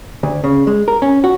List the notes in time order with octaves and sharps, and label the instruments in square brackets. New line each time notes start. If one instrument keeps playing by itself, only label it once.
[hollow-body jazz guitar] D2
C#3
G#3
A#4
C#4
F#4